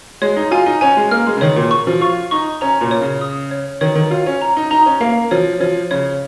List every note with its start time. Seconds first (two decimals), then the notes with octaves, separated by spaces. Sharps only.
0.22 G#3 C#5
0.36 D#4
0.51 F4 G#5
0.66 D#4
0.81 C#4 G#5
0.97 G#3
1.11 A#3 F6
1.27 G#3
1.37 C#3
1.41 D#3 C#5
1.56 A#2
1.71 C#6
1.87 F3
2.01 F4 C#6
2.31 D#4 C#6
2.61 C#4 A#5
2.81 A#2
2.91 C#5
3.01 C#3
3.21 D#6
3.51 C#5
3.81 D#3 C#5
3.96 D#3
4.11 F4 C#5
4.26 C#4
4.42 A#5
4.57 D#4
4.71 D#4 A#5
4.86 C#4
5.00 A#3 F5
5.31 F3 C#5
5.60 F3 C#5
5.91 C#3 C#5